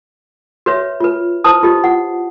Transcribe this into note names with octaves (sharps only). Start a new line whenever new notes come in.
F#4 B4 C#5 E5
F4 B4
E4 B4 C5 A5 D#6
F4 G4 D#5
F#5